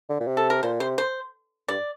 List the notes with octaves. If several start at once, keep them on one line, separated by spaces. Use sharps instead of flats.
D3
A#2
C3
A4
A#4
A#2 C5
C3 C5
C5
G2 D5